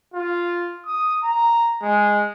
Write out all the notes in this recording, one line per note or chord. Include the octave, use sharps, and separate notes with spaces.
F4
D#6
A#5
G#3